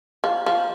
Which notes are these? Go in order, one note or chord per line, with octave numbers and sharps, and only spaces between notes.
F3
F3